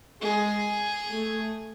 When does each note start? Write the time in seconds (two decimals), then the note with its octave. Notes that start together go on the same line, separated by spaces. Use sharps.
0.22 G#3 G#4
1.11 A3